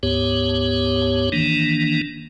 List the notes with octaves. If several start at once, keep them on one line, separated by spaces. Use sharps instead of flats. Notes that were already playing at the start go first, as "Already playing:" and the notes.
D2 G#2 B3 G4 C#5
D#3 E3 A#3 D4